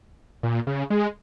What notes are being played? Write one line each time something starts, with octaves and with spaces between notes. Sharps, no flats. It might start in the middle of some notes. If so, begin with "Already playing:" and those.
A#2
C#3
G#3